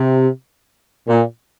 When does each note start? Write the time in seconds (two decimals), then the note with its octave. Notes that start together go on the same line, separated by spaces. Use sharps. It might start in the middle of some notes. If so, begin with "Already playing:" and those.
Already playing: C3
1.08 A#2